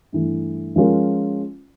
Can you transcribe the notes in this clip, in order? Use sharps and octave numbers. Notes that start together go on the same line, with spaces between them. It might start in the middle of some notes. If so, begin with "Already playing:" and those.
G2 E3 A3
F3 G#3 C#4 F4 A#4